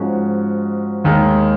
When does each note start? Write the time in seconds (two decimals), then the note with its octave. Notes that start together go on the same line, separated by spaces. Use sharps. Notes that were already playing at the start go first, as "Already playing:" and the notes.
Already playing: G#2 F3 G#3 C#4 F#4
1.04 D#2 D#3 G#3